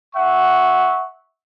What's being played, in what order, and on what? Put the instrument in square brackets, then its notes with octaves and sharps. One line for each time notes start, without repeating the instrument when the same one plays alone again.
[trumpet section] E5 F#5 C#6